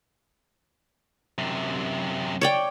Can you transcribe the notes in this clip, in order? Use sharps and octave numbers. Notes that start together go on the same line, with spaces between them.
F#2 C3
C#5 D5 G5